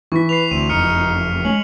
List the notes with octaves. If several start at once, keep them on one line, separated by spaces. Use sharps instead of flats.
E3 C#6 B6
B4 C7 F7
D2 C4 D#7
F#1 F2 D#4 F6 C#7 D#7
G#3 A3 C#4 F#7